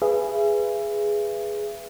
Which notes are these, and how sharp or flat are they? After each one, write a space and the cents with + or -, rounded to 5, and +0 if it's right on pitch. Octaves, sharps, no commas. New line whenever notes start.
G#4 +0 B4 +0 E5 +40